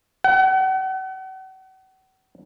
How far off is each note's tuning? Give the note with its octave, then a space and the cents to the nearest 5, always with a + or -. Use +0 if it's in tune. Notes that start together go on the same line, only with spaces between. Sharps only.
F#5 +40